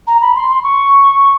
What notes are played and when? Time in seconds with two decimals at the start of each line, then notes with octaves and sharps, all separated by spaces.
0.07 A#5
0.21 B5
0.36 C6
0.49 C6
0.63 C#6